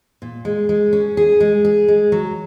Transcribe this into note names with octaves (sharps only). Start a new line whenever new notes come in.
A#2
G#3
G#3
C#4
G#4
G#3
G#4
G#3
F#3